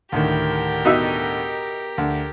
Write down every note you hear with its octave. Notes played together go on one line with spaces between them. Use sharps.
D2 A2 D#3 G4 A#4
B2 D#4 E5
D2